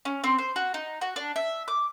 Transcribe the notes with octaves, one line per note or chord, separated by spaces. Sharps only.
C#4
C4
C5
F#4
D#4
F#4
D4
E5
D6